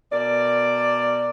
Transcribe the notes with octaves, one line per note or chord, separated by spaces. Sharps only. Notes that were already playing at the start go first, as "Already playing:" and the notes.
B2 A#4 D5